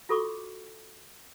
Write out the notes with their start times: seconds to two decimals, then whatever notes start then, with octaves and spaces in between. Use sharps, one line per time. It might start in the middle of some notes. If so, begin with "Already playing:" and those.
0.09 F4 F#4 A4 B5 C#6 D6